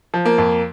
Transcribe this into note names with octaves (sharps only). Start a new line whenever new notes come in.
F3
A#3
F2